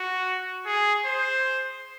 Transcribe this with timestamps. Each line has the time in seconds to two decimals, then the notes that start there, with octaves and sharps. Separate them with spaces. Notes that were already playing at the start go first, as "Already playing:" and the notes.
Already playing: F#4
0.66 G#4
1.06 C5